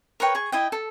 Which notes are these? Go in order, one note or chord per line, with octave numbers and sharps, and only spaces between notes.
A#4 B4 C#5 G5
G#4 C#6
E4 D#5 G5
A4